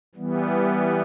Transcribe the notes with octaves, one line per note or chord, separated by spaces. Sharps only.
E3 G3 B3